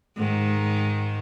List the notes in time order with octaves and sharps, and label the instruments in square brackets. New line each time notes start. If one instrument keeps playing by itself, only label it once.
[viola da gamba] G#2 D#3